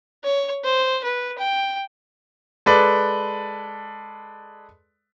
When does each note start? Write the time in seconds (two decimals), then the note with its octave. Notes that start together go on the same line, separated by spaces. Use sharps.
0.24 C#5
0.64 C5
1.04 B4
1.38 G5
2.66 G#3 A4 B4 D5